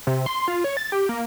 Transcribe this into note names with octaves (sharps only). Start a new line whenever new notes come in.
C3
C6
F4
C#5
A6
G4
A#3